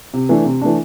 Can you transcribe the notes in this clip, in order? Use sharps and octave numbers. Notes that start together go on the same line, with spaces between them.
C3
E3 A3 D4
C3
E3 A3 D4